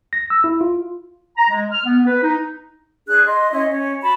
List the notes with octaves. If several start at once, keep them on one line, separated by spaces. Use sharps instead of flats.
A#6
E6
E4
F4
A#5
G#3
F6
B3
B4
D#4
D4 G#4 F#6
D#5 C6
C#4 E4 D#5
C#4
F#4 A5 B5